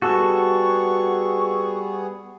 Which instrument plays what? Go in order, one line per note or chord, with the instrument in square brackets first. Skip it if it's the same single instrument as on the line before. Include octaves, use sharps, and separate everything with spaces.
[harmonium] G3 B3 G#4 [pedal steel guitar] F#4 A4 [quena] C#6